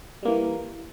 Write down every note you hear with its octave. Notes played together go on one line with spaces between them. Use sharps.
E3 G3 A#3